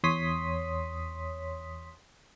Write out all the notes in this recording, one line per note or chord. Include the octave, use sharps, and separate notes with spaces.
E2 C#5 C6 D#6 B6